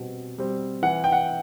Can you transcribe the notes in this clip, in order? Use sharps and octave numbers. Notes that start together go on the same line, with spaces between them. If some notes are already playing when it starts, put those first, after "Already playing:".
Already playing: B2 G3 C4
G3 C4
E3 F#5
G5
F#5